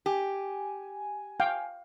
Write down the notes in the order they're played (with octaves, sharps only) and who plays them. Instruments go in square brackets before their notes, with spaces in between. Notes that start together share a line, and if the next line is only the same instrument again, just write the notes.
[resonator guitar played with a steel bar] G4 [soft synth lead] G#5
[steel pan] F5 G5